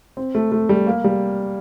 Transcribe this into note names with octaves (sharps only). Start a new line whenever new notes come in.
C4
A3
A3
G3
A#3
G3